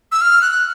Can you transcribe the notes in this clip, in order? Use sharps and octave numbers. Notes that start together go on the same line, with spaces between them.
E6
F6
F#6